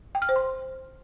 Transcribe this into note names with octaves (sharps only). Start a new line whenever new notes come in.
G5
F6
C5
C6